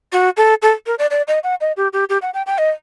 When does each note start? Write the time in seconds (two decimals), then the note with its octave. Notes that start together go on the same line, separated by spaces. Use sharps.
0.12 F#4
0.37 A4
0.62 A4
0.87 A#4
0.99 D5
1.11 D5
1.28 D#5
1.44 F#5
1.61 D#5
1.77 G4
1.93 G4
2.09 G4
2.22 F#5
2.34 G5
2.47 G5
2.58 D#5